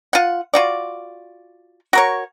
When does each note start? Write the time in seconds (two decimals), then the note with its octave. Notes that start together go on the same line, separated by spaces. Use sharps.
0.13 F4 F#5
0.54 F4 F#4 D5
1.93 F#4 A#4 C#5